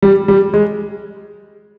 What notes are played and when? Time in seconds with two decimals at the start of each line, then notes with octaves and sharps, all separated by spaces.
0.02 G3
0.28 G3
0.54 G#3